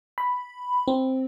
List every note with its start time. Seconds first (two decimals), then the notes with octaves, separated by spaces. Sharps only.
0.18 B5
0.88 C4